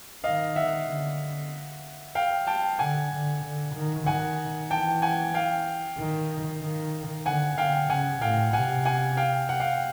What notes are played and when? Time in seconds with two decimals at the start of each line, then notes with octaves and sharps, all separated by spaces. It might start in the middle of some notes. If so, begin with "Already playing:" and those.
0.24 D#3 D#5 F5
0.56 E5 F#5
0.87 D3
2.15 F5 G5
2.47 G5 A5
2.79 D3 F#5 G#5
3.11 D3
3.44 D3
3.74 D#3
4.06 D#3 F#5 G#5
4.70 E3 G5 A5
5.02 F#5 G#5
5.34 F5 G5
5.98 D#3
6.62 D#3
7.26 D3 F#5 G#5
7.57 D3 F5 G5
7.89 C#3 F#5 G#5
8.21 A2 F5 G5
8.53 C3 F#5 G#5
8.85 F#5 G#5
9.17 F5 G5
9.49 F#5
9.60 F5 G5